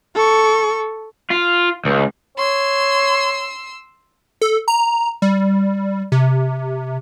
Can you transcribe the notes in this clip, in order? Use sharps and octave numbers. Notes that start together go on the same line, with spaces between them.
A4 C#6
F4
C#2
C#5 C6 E6
A4
A#5
G3
C3